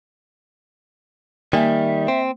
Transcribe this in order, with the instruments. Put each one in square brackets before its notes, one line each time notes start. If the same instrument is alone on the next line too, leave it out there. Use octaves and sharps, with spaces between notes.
[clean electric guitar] D#3 G3 [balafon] A#3 G#5 [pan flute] E5
[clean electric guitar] C4